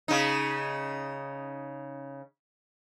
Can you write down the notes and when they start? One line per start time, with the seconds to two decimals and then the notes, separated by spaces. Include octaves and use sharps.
0.08 C#3 D#4